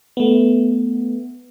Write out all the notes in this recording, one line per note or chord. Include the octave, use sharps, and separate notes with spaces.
A3 B3